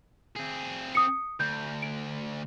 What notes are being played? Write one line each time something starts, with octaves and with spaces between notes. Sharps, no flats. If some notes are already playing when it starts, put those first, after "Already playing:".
C4 G#4
D#6 C#7
D2 G6
D7